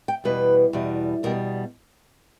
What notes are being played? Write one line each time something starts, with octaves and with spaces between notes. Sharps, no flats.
G5
E2 B2 G3 B4
E2 B2 G3
E2 B2 G3 A#4